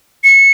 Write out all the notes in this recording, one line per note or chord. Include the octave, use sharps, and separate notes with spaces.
C#7